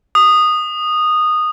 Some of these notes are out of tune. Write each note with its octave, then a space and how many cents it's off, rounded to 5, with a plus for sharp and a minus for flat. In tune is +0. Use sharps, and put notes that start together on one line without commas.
D#6 -15